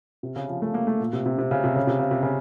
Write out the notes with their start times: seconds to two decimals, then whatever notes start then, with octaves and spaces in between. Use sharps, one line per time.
0.23 C3
0.36 C#3
0.49 F3
0.62 A3
0.74 A#3
0.87 A3
1.00 A#2
1.13 C3
1.26 C3
1.38 C3
1.51 C#3
1.64 C3
1.76 C#3
1.87 C3
1.99 C#3
2.11 C3
2.23 C#3